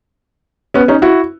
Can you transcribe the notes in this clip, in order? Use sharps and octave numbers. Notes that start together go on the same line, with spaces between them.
B3 C#4
C#4 D#4
E4 F#4